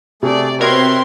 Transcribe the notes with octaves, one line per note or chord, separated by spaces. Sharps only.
C3 A3 G#4 D5
B2 C4 A#4 B4 C#5 E5 C6 G#6